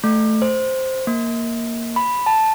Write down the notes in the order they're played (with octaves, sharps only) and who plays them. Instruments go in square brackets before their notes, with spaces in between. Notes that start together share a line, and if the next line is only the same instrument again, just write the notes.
[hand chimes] A3
C5
A#3
B5
A5